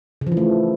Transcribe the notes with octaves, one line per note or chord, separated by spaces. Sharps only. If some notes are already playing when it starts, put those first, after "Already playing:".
C#3
F3
E3
A3